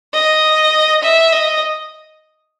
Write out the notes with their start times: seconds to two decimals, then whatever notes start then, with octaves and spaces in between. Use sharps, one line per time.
0.14 D#5
1.03 E5
1.32 D#5